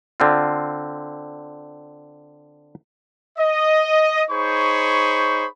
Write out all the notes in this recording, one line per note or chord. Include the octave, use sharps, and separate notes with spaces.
D3 C4 F4
D#5
D#4 G#4 C5 C#5 B5 C#6